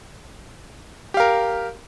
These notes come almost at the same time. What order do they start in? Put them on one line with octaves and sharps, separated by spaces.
G4 F5 A#4